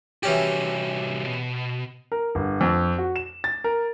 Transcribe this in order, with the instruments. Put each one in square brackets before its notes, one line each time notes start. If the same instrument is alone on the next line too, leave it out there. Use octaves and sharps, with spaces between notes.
[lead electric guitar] C2 F#4 [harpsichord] E3 C#4 G4
[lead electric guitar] B2
[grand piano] A#4
G1
F2
F#4
E7
A6
A#4